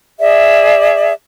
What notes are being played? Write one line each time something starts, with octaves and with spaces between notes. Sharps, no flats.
G#4 D5 E5